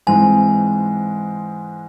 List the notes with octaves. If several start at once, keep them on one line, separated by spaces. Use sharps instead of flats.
G#2 E3 G#3 C4 G#5